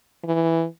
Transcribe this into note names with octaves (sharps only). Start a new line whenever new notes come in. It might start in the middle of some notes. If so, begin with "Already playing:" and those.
E3